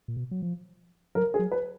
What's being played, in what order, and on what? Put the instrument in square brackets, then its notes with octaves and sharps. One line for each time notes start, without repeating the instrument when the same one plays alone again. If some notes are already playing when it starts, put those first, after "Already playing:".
[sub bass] A#2
B2
F#3
F3
[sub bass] F#3 [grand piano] A#4
[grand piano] G#4
[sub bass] F#3
[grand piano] B4